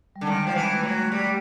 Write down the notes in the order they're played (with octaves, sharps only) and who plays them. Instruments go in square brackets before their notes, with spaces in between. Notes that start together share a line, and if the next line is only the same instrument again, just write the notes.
[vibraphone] G3
[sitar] D3
[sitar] D#3 [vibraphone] G#3
[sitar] F3
E3
[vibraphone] A3
[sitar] F#3
G3